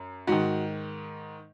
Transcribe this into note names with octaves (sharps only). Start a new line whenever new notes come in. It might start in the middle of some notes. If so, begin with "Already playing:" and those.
Already playing: F#2
G#2 D#3 F#4